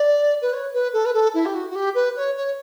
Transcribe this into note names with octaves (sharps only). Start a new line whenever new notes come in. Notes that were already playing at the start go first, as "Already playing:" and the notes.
Already playing: D5
B4
C#5
B4
A4
B4
A4
E4
G4
F#4
F#4
G4
B4
C#5
C#5